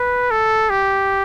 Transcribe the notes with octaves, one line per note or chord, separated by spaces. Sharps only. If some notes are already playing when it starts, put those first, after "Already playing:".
Already playing: B4
A4
G4